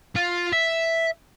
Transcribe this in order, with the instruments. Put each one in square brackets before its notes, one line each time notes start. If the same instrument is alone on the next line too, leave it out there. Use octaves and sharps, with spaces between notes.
[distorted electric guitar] F4
E5